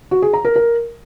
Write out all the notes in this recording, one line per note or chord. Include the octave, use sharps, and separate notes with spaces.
F#4
G#4
A#5
A#4
A#4